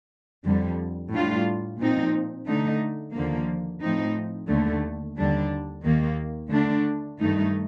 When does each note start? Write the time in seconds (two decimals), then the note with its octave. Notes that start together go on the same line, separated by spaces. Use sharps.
0.44 F2 D3 G3
1.12 A2 G3 D4 F4
1.79 A#2 F3 C4 D#4
2.46 D3 A3 D#4
3.13 D#2 D3 F3 A#3
3.81 A2 F3 C4 D#4
4.48 D#2 D3 A3
5.17 D#2 D3 G3 D4
5.84 D#2 D#3 A#3
6.50 D3 A3 D4
7.18 G2 D#3 A3 D#4